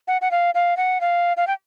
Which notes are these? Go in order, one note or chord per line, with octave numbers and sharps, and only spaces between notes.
F#5
F#5
F5
F5
F#5
F5
F5
G5